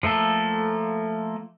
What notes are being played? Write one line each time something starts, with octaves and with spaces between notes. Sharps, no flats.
F3 A3 A#3 A4